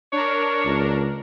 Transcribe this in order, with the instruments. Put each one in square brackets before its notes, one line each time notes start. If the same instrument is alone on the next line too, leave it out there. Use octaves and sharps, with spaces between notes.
[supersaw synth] D4 A#4 [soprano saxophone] C#5
[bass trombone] C#2